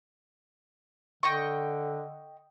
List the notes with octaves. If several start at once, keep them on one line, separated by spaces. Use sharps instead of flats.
D3 D#5 G5 C#6